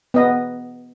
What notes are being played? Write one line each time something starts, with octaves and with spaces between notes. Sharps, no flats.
B3 D#5